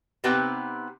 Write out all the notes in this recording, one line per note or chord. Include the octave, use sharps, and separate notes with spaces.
C3 B3 C4 D#4 G4 B4